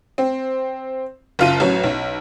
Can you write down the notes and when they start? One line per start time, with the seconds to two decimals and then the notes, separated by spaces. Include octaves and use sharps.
0.18 C4
1.39 F#1 F4 D#7
1.60 A1 F#3
1.84 B1